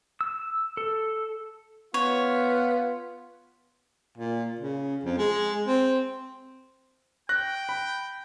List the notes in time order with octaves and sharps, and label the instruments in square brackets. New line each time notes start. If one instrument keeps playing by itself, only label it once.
[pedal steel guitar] E6
A4
[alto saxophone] B3 [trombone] F4 [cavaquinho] C#5
[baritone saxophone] A#2
C#3
F2
G#3
C4
[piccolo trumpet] G5 [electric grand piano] F#6 A#6
[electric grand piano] B5